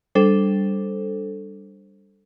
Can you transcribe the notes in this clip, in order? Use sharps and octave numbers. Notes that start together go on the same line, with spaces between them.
G3 D4 A4 C5